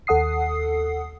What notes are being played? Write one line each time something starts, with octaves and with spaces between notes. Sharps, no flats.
D#2 A4 F#5 D#6 C7